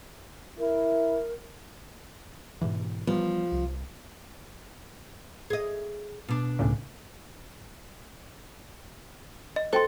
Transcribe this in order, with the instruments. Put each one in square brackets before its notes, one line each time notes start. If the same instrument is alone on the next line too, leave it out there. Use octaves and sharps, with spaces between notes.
[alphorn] E4 [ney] A#4
[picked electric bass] G#2 B2 E3
[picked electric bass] E3 G3 B3 [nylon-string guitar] F3
[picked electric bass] C2
[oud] G#4 D#5
B2 D4
[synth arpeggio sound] C#2 A2 C#3
[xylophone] D#5
[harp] A4 [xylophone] C5 G5 C6